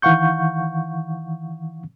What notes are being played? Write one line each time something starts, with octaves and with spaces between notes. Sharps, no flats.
D#3 E3 F5 F#5 C#6 G6